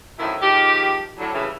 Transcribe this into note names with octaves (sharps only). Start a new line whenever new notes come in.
F#2 A2 C3 D#3 F3 E4
D#3 F3 G#3 G4
A2 D3 F#3
G2 C#3 E3